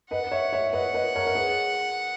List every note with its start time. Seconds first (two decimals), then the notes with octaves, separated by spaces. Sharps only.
0.11 B4 D#5 F#5
0.31 C#5 E5
0.53 C#5 E5
0.73 B4 D#5 F#5
0.94 B4 D#5
1.15 A#4 C#5
1.27 A#4
1.35 G#4 B4